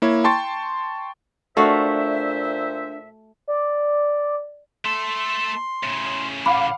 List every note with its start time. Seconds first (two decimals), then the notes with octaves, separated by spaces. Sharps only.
0.02 A#3 E4 C#5
0.24 G5 A5 C6 C#6 A6
1.57 A#2 A3 D4 F#4 C5 C#5 E5 F5
3.48 D5
4.85 A3 A4 C6
5.83 A2 C#3
6.46 F5 F#5 B5 D6